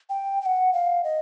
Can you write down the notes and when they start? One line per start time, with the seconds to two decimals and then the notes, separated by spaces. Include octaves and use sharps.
0.10 G5
0.42 G5
0.46 F#5
0.73 F5
1.04 D#5